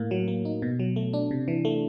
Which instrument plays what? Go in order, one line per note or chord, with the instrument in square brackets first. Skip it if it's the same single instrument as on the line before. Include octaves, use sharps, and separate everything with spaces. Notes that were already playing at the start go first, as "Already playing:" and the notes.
Already playing: [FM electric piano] A2 A#3
F#3
A#3
D#4
B2
F#3
A3
D4
C3
E3
A3